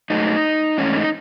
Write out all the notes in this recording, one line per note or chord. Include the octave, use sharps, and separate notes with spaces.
G#2 F#3 A3 D#4
G#2 E3 A3 C#4
D#4